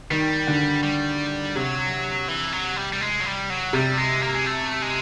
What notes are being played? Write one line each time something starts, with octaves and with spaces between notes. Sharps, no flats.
D#3 G3
D3
G3
C3 F#3
E3
F#3
G3
G3
G#3
F#3
G3
F#3
C3 G3
G#3
A#3
G#3
A3
G#3